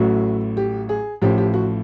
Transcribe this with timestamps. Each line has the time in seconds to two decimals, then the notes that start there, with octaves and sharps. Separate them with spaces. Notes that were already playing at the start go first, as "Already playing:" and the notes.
Already playing: A1 A2 F#3 A3 F#4
0.57 G4
0.89 G#4
1.22 A1 A2 F3 G4
1.38 G4
1.54 F#4